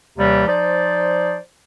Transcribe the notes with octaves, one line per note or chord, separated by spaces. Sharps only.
D#2 C3 E3 G3
F3 D#4 C5 D5